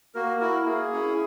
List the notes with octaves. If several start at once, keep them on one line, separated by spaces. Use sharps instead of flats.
A#3 F#4 A#4
E4 F#4 A#4
A#3 G#4
C#4 E4